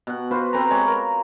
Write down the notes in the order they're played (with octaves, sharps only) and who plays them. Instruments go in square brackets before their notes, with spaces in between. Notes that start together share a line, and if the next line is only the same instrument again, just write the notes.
[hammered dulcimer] B2 F#5
F4 F#4 B4 C5
C4 A4 B4 A#5
G#3 C#5
A#4